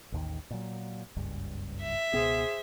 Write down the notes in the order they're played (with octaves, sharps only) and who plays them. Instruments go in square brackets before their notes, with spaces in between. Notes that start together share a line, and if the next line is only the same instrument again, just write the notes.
[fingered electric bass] A1 D#2 D#3
A#2 F#3
F#1 C#2 G2
[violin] E5
[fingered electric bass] C#2 B2 B3 [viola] G#4 C5